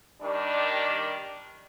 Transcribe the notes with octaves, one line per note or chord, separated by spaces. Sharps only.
D#3 G3 D4